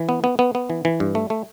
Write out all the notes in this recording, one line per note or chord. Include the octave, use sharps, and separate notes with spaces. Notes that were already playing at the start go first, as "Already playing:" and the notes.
Already playing: E3
B3
B3
B3
B3
E3
E3
G2
A3
A3